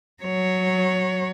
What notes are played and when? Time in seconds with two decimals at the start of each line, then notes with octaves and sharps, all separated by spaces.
0.23 F#3 C#5